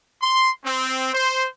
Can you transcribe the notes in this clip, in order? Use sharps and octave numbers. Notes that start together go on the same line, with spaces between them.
C6
C4
C5